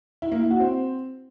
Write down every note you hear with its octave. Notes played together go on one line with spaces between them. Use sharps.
E4
A#3
E4
F#4
C4